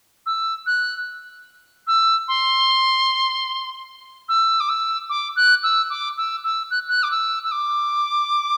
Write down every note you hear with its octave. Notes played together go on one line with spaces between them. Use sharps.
E6
F#6
E6
C6
E6
D6
E6
D6
F#6
E6
D6
E6
E6
F#6
F#6
D6
E6
E6
D6